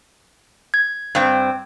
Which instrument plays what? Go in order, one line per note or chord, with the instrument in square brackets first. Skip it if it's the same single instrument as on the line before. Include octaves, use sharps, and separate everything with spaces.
[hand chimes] G#6
[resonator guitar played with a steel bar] G2 C4